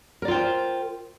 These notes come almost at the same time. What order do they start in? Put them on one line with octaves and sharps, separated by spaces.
A#4 D5 F4 G5 C5